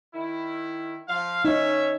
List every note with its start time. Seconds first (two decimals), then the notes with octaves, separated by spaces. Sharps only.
0.14 D#3 E4
1.08 F3 F5
1.45 C#4 D#4 C#5 E5